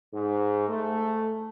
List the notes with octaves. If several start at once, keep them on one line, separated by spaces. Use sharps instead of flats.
G#2
A3